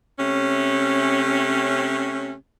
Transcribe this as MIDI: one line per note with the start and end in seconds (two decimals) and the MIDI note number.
0.18 2.32 48
0.18 2.32 57
0.18 2.32 61